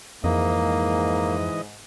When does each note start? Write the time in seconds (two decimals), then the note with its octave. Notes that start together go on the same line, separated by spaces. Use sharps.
0.24 F2 G#2 E3 A#3 D#5